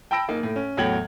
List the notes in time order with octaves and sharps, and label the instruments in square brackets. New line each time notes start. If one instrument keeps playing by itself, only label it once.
[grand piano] G5 A5 B5 E6 A#6 D7
F#1 A#3 D#4
A2
C#4
E2 A2 F#3 G5 G#6 F#7